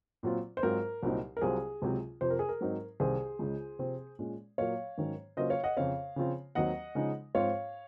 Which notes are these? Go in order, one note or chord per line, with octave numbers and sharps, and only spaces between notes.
A#2 F#3 C4 F4
C5
G#2 F#3 C4 F4 A#4
C2 A#2 F#3 C4 D#4
A#4
C2 C3 F#3 C4 F4 G#4
C#2 C3 F#3 C4
F2 C3 F3 C5
A#4
G#4
A#4
G#2 F#3 C4 D#4
C2 C3 D#3 G#4 C5
C#2 C#3 G#3
C3 F3 C4
A#2 G#3 C#4
A#2 F#3 A#3 C#5 F5
G#2 D#3 F#3 C#4
C#3 F#3 A#3 C#4 F4 C5 D#5
C#5 F5
D#5 F#5
F2 C#3 F3 C4 C#5 F5
C#3 F3 C4 F4
D#2 D#3 F#3 C4 D#5 F#5
C#3 F3 G#3 D#4
G#2 F3 C4 F4 C#5 F5